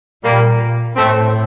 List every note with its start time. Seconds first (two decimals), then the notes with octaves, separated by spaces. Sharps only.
0.23 A#2 G3 A#3
0.96 A2 A3 C4